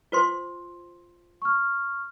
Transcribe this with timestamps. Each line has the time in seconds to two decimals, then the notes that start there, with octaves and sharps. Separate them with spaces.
0.12 F4 C5 C6
1.42 C#6 F6